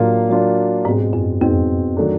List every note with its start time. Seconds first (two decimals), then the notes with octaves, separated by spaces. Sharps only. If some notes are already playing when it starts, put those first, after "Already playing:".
Already playing: A2 F#3 A#3 D4 F4
0.29 F#3 A#3 D4 F4
0.85 G#2 B2 G#3 C4
1.13 F#2
1.41 F2 B2 G#3 C4
1.97 D#3 F#3 A3 D4